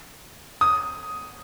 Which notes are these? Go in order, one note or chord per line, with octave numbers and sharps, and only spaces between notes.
D#6